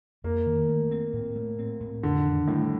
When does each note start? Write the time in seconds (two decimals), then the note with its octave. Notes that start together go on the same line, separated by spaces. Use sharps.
0.24 F2 A#3
0.46 D#3
0.69 A3
0.91 C4
1.13 A2
1.36 A3
1.59 C4
1.80 A2
2.03 F2 D3
2.25 D#3
2.47 A2 G3